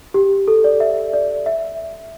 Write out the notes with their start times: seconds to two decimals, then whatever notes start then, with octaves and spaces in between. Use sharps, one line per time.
0.14 G4
0.48 A4
0.64 D5
0.80 E5
1.13 D5
1.46 E5